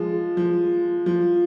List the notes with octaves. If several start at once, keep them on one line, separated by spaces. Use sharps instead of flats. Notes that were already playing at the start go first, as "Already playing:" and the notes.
Already playing: F3 G#3
F3
F3